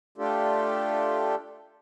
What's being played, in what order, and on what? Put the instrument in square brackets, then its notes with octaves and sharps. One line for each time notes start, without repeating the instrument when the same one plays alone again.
[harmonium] A3 D4 F4 G4 A4